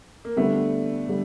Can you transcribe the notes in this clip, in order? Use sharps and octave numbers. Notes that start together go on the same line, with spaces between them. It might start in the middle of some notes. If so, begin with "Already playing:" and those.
A#3
D3 G3 A3 B3
D3 G3